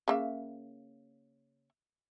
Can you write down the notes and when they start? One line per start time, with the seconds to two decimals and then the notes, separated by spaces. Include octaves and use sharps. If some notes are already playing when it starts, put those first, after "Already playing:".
0.08 C#3 A#3 E5